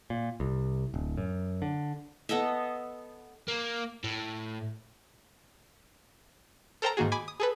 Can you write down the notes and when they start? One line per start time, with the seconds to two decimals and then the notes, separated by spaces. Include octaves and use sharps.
0.10 A#2
0.40 C2
0.94 D1
1.17 F#2
1.62 D3
2.29 B3 A4 D#5 E5
3.48 A#3
4.04 A2
6.82 A4 A#4 C5 G5 A5 A#5
6.97 G#2 D#3 A#3 F#4 G#4
7.12 G#5 B5 D6
7.28 D#6
7.40 G#4 A4 B4